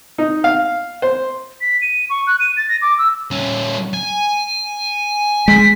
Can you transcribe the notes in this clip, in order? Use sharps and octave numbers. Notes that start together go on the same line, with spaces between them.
D#4
F5
C5
B6
D#7
C#6
F#6
D#7
A6
A#6
D6
E6
G3 C#4
G#5
G#3 B6